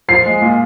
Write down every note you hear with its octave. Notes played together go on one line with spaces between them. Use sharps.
F3 C7
G#3
A#2